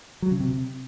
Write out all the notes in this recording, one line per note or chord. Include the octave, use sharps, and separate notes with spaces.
F#3
C#3
C3